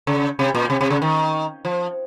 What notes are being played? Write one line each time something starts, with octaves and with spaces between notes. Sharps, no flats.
C#3
C3
A#2
C3
C3
C#3
D#3
F3